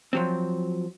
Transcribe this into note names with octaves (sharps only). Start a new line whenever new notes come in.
F3 F#3 C4